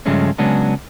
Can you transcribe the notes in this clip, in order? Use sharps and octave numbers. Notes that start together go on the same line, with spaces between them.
G2 C#3 F3 G#3 A3 C#4
C#3 F#3 G#3 B3 C#4 D4